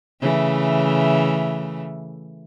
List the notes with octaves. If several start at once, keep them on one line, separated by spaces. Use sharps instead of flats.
C#3 E3 A3